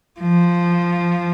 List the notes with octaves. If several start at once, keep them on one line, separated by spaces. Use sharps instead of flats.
F3